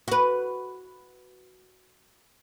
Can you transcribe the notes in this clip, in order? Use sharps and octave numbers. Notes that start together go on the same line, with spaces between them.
F#4 B4